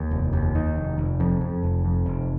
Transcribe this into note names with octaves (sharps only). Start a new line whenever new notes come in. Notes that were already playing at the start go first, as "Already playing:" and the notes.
Already playing: D#2
F1
D#2
D#3
F1
F1
F2
F2
F1
F2
F1